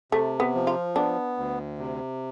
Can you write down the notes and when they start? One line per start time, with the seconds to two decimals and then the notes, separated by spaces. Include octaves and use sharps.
0.12 C3 A3
0.40 B3
0.54 F3
0.67 F4
0.96 B3 D4
1.37 D2
1.78 C3